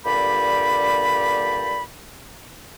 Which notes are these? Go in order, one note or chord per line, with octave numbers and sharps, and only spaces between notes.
G2 A#2 D3 G4 D5 B5